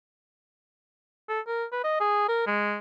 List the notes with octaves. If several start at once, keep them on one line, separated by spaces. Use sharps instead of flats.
A4
A#4
B4
D#5
G#4
A#4
G#3